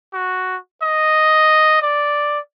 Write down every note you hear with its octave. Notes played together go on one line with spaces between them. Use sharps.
F#4
D#5
D5